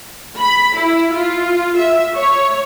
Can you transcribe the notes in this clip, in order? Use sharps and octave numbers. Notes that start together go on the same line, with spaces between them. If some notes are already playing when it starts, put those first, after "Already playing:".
B5
E4
F4
E5
C#5